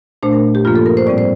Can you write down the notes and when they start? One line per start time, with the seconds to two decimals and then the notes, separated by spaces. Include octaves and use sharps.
0.23 A#2 A3 D4 C5
0.33 A#4
0.55 G4
0.65 G2 F3 A#3 F4
0.76 A4
0.86 A#4
0.97 C5
1.07 A2 G3 C4 D5
1.18 C5